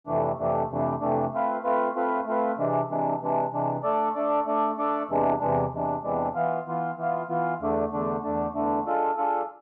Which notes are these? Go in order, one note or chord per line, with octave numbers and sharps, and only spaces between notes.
F2 C3 E3 A3 D4
F2 C3 E3 A3 D4
F2 C3 E3 A3 D4
F2 C3 E3 A3 D4
A3 C4 F4 B4
A3 C4 F4 B4
A3 C4 F4 B4
A3 C4 F4 B4
C3 E3 G#3 D4
C3 E3 G#3 D4
C3 E3 G#3 D4
C3 E3 G#3 D4
A3 D4 A4 D5
A3 D4 A4 D5
A3 D4 A4 D5
A3 D4 A4 D5
E2 C3 E3 G#3 D4
E2 C3 E3 G#3 D4
E2 C3 E3 G#3 D4
E2 C3 E3 G#3 D4
E3 B3 F4
E3 B3 F4
E3 B3 F4
E3 B3 F4
E2 D3 A3 D4
E2 D3 A3 D4
E2 D3 A3 D4
E2 D3 A3 D4
G#3 D4 F4 A4
G#3 D4 F4 A4